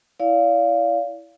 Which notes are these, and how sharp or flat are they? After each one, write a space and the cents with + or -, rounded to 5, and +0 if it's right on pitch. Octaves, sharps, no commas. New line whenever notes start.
E4 +0 D5 -35 F5 +0